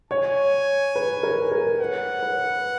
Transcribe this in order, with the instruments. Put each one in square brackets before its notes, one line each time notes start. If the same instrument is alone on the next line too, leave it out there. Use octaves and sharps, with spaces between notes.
[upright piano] C#5 [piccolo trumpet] G#5
[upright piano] B4
A#4
A#4
[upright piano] B4 [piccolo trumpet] F#5
[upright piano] B4